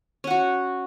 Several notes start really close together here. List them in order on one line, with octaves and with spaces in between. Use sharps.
C#4 F#5 F#4